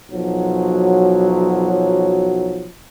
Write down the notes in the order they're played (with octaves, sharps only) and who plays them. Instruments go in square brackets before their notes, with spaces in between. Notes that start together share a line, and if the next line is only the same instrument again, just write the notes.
[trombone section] B1 F3 F#3